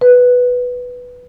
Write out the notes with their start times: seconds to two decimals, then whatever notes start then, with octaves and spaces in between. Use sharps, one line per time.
0.01 B4